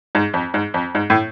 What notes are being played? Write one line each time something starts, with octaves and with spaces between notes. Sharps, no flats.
G#2
F2
G#2
F2
G#2
A2